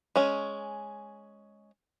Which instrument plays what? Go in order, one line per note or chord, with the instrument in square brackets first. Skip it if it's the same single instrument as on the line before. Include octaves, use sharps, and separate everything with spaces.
[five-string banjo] G#3 C#4